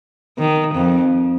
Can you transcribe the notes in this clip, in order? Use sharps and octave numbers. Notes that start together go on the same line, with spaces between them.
D#3
F2